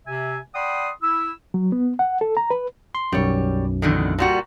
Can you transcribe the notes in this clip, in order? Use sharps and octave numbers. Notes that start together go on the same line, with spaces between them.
C3 E5 G#5
D5 F#5 G5 B5 C6 D#6
E4 E6
F#3
B3
F#5
A4
A#5
B4
C6
B1 F#2 G3 C#5
E2 D3 D#3
A#2 G3 F#4